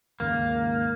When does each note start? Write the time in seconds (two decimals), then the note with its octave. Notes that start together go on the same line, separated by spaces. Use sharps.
0.20 D#2 G#2 C#3 A#3